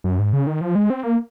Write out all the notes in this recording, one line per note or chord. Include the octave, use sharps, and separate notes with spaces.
F#2
G#2
C#3
D#3
F3
G#3
C4
A#3